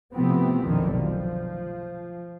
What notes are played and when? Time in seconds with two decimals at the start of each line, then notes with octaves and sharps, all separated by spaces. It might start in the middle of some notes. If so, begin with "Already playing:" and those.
0.14 C3 E3 F3 A3 B3 C4
0.64 F1 B1 B2 D3 D#3
0.97 F3